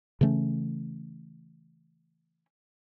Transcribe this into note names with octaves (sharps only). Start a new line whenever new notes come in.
C#3 E3 A3 C#4